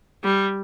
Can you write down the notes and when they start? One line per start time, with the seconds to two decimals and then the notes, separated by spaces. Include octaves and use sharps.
0.24 G3